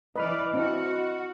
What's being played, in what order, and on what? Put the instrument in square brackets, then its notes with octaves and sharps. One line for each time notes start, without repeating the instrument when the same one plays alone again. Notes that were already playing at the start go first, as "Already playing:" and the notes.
[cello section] E3 D5 [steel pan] B4 [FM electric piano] D#5 B5 F6
[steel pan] C4 D4 E4 [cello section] F#4